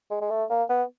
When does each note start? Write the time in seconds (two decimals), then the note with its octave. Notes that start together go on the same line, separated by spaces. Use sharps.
0.11 G#3
0.21 G#3
0.31 A3
0.50 A#3
0.69 B3